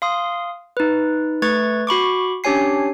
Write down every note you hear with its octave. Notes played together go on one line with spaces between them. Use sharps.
F5 C6 D#6
D#4 B4
A3 B4 C#6 G#6 A6
F#4 B5 C#6 D6
C#4 D4 G4 C#5 G#5 C7